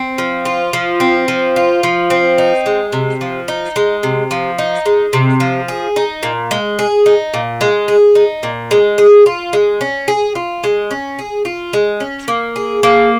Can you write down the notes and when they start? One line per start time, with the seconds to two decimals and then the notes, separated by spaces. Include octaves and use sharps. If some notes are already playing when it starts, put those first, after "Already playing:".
Already playing: C4
0.18 F3
0.45 F4
0.73 F3
1.00 C4
1.28 F3
1.56 F4
1.83 F3
2.10 C4
2.38 D#4
2.66 G#3
2.93 C3
3.21 F3
3.48 D#4
3.76 G#3
4.03 C3
4.31 F3
4.58 D#4
4.86 G#3
5.13 C3
5.40 F3
5.68 G#4
5.96 D#4
6.23 A#2
6.51 G#3
6.79 G#4
7.06 D#4
7.34 A#2
7.61 G#3
7.88 G#4
8.15 D#4
8.43 A#2
8.71 G#3
8.98 G#4
9.26 F4
9.53 G#3
9.81 C#4
10.08 G#4
10.35 F4
10.64 G#3
10.91 C#4
11.19 G#4
11.45 F4
11.73 G#3
12.00 C#4
12.28 A#3
12.56 G#4
12.83 A#3